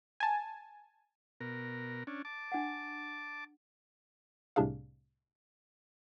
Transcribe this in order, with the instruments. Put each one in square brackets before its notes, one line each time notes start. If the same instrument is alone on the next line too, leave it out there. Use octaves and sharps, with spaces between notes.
[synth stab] G#5 A5
[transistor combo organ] B2 A#4
C#4 D4
A5 D6
[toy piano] D4 F#5
[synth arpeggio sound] C2 A2 C3 D4 G#4 F5